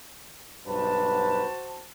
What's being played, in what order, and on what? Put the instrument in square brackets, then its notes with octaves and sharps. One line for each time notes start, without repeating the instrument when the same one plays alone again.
[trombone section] B1 G2 B4 [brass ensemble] F#4 C5 A5